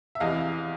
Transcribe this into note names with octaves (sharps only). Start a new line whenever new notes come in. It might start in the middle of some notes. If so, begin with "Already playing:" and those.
E5
E2 C3 E3 D#5 F5